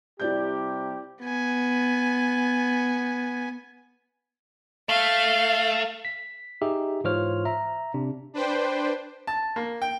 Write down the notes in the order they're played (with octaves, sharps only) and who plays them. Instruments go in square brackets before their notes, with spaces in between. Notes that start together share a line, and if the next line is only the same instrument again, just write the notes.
[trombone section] C3 G3 G4 [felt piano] E4 D5 G6
[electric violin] B3 G#5
[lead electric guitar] A3 [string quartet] F5
[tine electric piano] B6
D#4 G4 G#4 E5
G#2 E3 F4 C5 C#5 F6
E5 A#5
C3 D4
[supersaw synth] D4 B4 C5 G5
[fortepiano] A5
A#3
G5